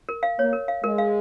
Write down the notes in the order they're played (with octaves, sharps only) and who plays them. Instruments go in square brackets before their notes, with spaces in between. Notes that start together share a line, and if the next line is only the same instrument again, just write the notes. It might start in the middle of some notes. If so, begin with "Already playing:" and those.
[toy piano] A#4
F5
[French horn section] A#3 [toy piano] C#5
[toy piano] A#4
F5
[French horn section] G#3 [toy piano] A#4
[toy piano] F5